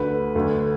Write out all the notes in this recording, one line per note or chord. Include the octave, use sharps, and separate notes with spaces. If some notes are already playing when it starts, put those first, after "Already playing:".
Already playing: D2 D3 B4
D2 D3